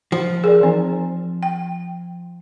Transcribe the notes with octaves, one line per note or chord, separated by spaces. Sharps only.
F3
G#4 A#4 D5
E3 C4 D#4
G5